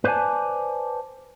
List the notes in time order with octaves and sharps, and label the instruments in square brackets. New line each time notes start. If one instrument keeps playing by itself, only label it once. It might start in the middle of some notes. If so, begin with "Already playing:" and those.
[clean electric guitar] B4 C5 D5 E5 G#5 A5